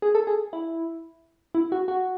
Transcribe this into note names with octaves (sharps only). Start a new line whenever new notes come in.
G#4
A4
G#4
E4
E4
F#4
F#4